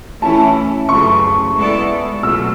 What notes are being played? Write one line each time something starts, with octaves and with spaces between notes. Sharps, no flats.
E3 A3 C#4 E4 A5
F#2 C#3 E3 A3 C#6
G#3 B3 E4 A4 D5
B2 F#3 A3 E6